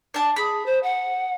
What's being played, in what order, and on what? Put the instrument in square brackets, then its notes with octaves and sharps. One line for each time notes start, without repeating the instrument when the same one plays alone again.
[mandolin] D4 A5
[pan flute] G#4 [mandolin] B5
[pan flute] C5
F#5